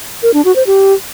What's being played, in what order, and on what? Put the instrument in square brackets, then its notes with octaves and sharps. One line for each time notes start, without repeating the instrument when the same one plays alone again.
[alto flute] A#4
D4
F#4
C5
G4